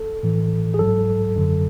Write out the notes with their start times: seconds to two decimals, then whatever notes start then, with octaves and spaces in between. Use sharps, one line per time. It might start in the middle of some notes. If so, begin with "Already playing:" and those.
Already playing: A4
0.23 A2 E3
0.74 G#4
0.79 G#2 F#3 A4
1.36 F#2 D3 F#3